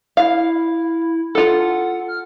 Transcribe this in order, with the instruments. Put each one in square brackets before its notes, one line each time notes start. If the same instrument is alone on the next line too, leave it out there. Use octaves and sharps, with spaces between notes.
[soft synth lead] E4 [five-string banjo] F5
[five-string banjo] F4 A4 [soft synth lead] F#5
[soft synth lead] F6